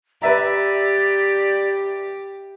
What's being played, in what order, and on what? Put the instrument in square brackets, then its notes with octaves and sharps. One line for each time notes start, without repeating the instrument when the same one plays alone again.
[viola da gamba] G4 [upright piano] B4 E5 A#5 [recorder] D5